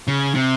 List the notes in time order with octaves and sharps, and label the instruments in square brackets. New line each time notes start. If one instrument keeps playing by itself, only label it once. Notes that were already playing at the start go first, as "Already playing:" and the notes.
[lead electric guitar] C#3
C3